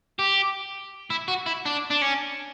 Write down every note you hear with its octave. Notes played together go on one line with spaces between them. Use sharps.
G4
E4
F#4
E4
D4
D4
C#4